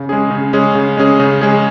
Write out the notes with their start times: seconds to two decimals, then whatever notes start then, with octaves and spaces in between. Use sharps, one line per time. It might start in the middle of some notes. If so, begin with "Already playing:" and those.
Already playing: C#3
0.09 G#3 C#4 G#4
0.31 C#3
0.53 G#3 C#4 G#4
0.75 C#3
0.97 G#3 C#4 G#4
1.20 C#3
1.41 G#3 C#4 G#4